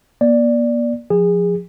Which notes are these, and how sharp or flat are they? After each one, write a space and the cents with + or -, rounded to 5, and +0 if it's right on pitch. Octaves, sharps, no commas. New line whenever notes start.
A#3 +45 D5 +0
F3 +20 G#4 -25